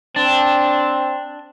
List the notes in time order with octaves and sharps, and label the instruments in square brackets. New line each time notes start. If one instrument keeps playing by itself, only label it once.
[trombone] C4 [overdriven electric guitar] D4